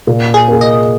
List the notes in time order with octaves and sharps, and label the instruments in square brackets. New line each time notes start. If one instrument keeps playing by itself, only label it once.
[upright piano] A#2
[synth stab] G#4
[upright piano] A#3 G#4
[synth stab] D#5